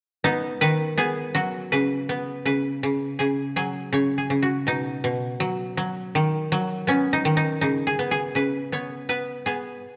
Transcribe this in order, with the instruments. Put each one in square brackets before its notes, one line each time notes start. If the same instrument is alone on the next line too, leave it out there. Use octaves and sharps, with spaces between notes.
[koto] B3 D#4
D#3 B4
B3 G#4
F#3 F#4
C#3 B4
B3
C#3 B4
C#3
C#3 G#4
F#3 G#4
C#3 C#5
G#4
C#3
F#4
B2 D#4
B2
F#3
F#3
D#3
F#3
B3 C#4
D#4
D#3
D#4
C#3 D#4
G#4
B3
G#4
C#3 B4
B3 C#5
B3 B4
B3 G#4